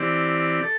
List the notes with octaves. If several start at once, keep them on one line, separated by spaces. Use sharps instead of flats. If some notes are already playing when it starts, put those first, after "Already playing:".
Already playing: E3 C4 G4 D5
A4